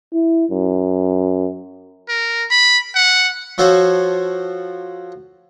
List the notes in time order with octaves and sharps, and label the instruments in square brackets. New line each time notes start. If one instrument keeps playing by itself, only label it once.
[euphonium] E4
F#2
[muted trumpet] A#4
B5
F#5
[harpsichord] F3 F#4 A4 C5 C#5